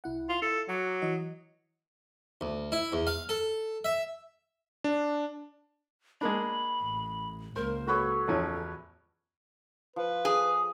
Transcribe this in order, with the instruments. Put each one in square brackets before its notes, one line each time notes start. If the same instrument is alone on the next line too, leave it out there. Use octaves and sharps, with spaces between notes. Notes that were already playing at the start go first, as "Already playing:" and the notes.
[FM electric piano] C2 E4 F#5
[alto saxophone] F4
[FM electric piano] E4 [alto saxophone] A4
[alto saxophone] F#3 [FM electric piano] F#5 A#5 D6
[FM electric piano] E3 F#4 D#5
[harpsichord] D2
E4
E2
F5
A4
E5
[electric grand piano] D4
[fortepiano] G#3 A#3 D4 [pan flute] B5
[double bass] A1
[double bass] C#2 A#3 [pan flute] A#4 [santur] C5
[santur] F#4 B4 C#5 [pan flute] A4
[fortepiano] A1 F3 C#4 [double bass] E2
[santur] F3 [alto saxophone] B4
[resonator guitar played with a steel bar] G#4